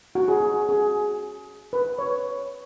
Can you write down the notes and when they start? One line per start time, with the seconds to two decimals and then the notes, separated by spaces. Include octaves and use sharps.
0.15 F#4
0.28 G#4
0.40 F#4
0.69 G#4
1.73 B4
1.99 C#5